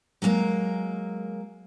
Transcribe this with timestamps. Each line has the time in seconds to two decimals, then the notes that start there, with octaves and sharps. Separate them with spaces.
0.22 F#3 G#3 A#3 A#5